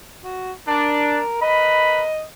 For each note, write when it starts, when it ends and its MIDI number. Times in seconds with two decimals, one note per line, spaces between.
0.24 0.52 66
0.68 1.20 62
0.68 1.40 70
1.42 2.05 70
1.42 2.05 71
1.42 2.22 75
1.42 2.05 83